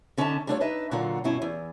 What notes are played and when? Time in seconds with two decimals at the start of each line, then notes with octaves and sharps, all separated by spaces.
0.18 D3 C#4 D#4 E5 G5 A5
0.47 G3 A3 D4 F4 A4 C#5
0.60 D4 D#4 B4 D#5 E5
0.91 A#2 D3 F#3 A#3 F4 F#5
1.24 G2 B2 F#3 C#4 E4
1.42 E2